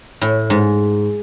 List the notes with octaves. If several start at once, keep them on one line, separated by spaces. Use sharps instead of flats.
A2
G#2